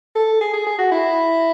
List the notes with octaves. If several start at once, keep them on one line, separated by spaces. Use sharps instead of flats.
A4
G#4
G#4
G#4
F#4
E4